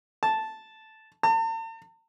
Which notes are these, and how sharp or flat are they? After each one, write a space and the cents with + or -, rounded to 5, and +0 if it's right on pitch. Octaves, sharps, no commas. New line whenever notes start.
A5 -5
A5 +45